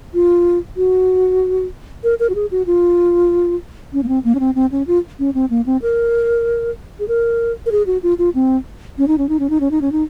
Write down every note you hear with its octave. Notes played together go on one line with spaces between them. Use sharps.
F4
F#4
A#4
A#4
F#4
G#4
F#4
F4
C#4
A#3
C4
A#3
C#4
C4
C4
C#4
F4
C#4
C4
A#3
C4
A#4
G#4
A#4
A#4
G#4
F#4
F4
F4
C4
C#4
D#4
C#4
D#4
C#4
D#4
C#4
D#4
C#4
D#4